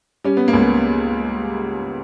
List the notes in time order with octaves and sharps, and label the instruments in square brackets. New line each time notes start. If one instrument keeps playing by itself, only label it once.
[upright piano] G3 C#4
B3
A#3
C#2
B3